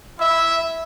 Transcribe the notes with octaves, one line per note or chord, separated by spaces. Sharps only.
E4 E5